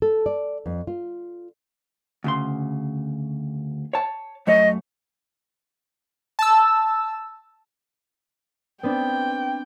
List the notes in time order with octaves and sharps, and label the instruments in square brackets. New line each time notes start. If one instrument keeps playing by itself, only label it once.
[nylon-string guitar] A4
D5
F2
F4
[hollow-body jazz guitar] D2 C#3 C6
C#5 A5
[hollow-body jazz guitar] F#2 A3 C#5 [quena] D#5
[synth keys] A5 E6
[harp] B3 C4 D4 [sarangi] G5